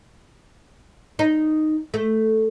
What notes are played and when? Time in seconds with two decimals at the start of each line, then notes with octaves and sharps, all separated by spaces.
1.19 D#4
1.94 A3